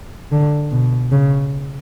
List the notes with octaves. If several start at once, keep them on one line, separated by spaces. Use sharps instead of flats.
D3
B2
C#3